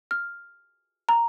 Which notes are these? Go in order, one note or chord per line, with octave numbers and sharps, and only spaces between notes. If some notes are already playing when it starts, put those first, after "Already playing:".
F6
A#5